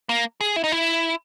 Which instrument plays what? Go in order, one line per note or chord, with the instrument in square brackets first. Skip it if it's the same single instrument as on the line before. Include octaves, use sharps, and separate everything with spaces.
[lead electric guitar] A#3
G#4
E4
D#4
E4